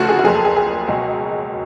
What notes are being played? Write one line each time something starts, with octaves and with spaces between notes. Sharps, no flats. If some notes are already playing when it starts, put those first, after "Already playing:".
Already playing: D2 C#3 F3 F#4 A4
G#4
F#4
F#1 F2 F3 G#4
A4
G#4
G#4
C#2 B2 F#3